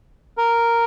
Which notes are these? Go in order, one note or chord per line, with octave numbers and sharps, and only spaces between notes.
A#4